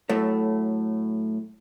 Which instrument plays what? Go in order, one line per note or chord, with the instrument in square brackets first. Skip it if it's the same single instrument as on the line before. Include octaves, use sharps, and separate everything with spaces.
[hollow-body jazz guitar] A2 F#3 A3